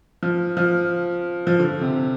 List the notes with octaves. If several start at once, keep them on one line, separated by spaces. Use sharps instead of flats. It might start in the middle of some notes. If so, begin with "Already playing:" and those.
F3
F3
F3
D3
C3